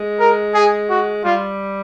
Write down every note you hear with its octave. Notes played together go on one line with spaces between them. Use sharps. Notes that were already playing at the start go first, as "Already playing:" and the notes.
Already playing: G#3
A#4
G#4
F#4
G3 F4